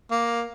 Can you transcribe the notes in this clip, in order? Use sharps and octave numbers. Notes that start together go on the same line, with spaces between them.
A#3